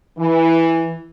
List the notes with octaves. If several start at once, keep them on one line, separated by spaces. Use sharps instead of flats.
E3